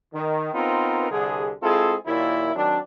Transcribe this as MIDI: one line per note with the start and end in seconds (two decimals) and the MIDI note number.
0.14 0.52 51
0.54 1.10 59
0.54 1.10 60
0.54 1.10 63
0.54 1.10 65
0.54 1.10 70
0.54 1.10 71
1.10 1.52 36
1.10 1.52 50
1.10 1.52 68
1.63 1.95 56
1.63 1.95 60
1.63 1.95 64
1.63 1.95 65
1.63 1.95 68
1.63 1.95 69
2.06 2.52 39
2.06 2.52 46
2.06 2.52 54
2.06 2.52 64
2.56 2.80 51
2.56 2.80 54
2.56 2.80 60
2.56 2.80 62